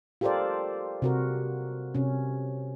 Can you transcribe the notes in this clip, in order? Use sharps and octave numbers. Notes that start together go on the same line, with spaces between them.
F4 G4 A4 A#4 C5 D5
C3 F#4 A#4
C3 C#4